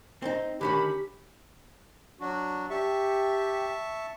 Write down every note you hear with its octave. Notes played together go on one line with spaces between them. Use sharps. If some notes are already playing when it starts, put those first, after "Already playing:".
C4 C#4 D#4
D3 D#3 C#4 G4 B5
F#3 D4 F#4
G4 E5 A5 C#6